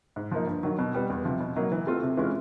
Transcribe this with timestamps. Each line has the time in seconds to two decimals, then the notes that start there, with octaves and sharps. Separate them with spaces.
0.16 G#2
0.32 F3 A#3 D#4
0.47 G2
0.63 D#3 F#3
0.79 B2
0.94 G3 B3
1.10 E2
1.25 C3 F3
1.41 B2
1.56 F#3 A#3 D#4
1.72 E3
1.87 A3 C4 F4
2.02 C3
2.17 E3 G#3 C#4 F4